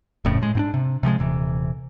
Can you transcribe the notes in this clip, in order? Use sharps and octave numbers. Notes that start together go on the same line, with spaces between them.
D#1 F2 A2 C#3
A2 G#3
G#2 C4 D4
C3
C3 F3 G3 G#3
D#1 C3 E3